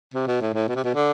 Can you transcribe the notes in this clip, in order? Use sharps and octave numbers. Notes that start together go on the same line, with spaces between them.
C3
B2
A2
A2
B2
C3
B2
D3